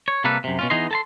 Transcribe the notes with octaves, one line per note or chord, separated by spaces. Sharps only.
C#5
C3 G3 A#3 A4 B4
F#2 C3
B2 C#4 F4
E3 B3 D#4 G#4 D#5 C6
A4 A5 C6